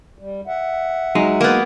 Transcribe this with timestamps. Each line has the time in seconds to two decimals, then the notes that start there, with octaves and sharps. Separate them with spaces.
0.19 G3
0.47 E5 F#5
1.15 F#3 G#3 D#4
1.41 A#3 B3